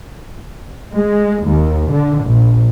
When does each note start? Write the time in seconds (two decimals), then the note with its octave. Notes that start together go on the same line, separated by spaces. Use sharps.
0.96 G#3
1.49 D#2
1.92 D3
2.23 A#1